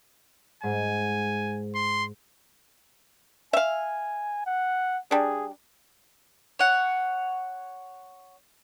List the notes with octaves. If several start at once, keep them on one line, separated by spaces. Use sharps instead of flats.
G#2 G#5
C6
E5 F5 G#5
F#5
G3 D4 G#4
C#5 F#5